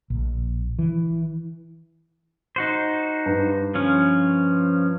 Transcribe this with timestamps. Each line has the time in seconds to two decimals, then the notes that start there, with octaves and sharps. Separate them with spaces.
0.10 A#1
0.79 E3
2.56 D#4 F#4 C5
3.26 G2
3.75 F3 C#4